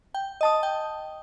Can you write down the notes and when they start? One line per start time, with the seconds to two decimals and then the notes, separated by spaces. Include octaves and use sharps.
0.14 G5
0.41 D#5 A5 D#6
0.63 G5